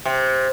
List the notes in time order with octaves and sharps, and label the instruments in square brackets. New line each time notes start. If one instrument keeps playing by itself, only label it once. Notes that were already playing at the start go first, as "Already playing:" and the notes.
[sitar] C3